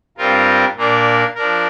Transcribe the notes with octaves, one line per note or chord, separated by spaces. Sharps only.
G2 G3 C4 F4 A#4
A#2 A#3 D4 A#4
F3 D4 A#4